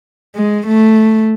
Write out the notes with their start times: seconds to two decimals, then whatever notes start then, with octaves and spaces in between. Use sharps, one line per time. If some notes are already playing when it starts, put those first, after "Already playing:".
0.36 G#3
0.67 A3